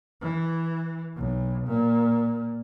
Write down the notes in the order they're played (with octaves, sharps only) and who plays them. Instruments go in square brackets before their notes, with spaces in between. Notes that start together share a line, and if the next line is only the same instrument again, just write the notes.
[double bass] E3
B1
A#2